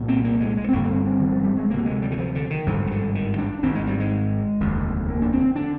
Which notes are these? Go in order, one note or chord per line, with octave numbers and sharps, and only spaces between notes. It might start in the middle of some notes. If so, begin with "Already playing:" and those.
Already playing: C2 A#2
C4
A#3
G#3
G#3
C4
G1 G2 D3 A#3
A#3
C4
C4
D#3
F3
G3
G#3
D2 C3 A#3
G#3
G3
D#3
F3
D3
D#3
G#1 G2 D3 F3
D#3
D3
D#3
D4
G#1 G#2 C4
G#3
G3
G#3
F1 D#2 D3
A#3
D4
C4
D3 D4